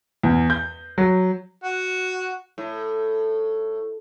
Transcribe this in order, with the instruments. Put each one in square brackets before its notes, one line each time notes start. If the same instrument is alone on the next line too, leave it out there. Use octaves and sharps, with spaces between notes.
[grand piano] E2
G6
F#3
[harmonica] F#4
[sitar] A2